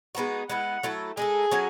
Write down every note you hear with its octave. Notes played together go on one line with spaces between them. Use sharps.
G#3 B3 D#4 F#4
G#3 B3 E4 F#5
F#3 A3 E4 A4
G#3 D#4 G#4 A4
F#3 C#4 F#4 A4